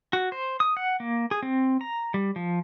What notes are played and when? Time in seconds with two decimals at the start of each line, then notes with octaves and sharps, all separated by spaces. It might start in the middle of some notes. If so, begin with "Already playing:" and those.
0.13 F#4
0.32 C5
0.60 D#6
0.77 F#5
1.00 A#3
1.31 G#4
1.43 C4
1.81 A#5
2.14 G3
2.36 F3